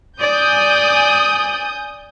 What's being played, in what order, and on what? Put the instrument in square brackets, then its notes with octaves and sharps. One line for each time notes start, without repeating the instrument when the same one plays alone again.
[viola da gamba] D5 [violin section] G#5 D#6 G6